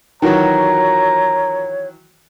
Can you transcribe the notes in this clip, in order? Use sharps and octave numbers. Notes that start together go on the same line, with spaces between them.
D#3 E3 F#3 F4 F#4 A#4 C#5 A#5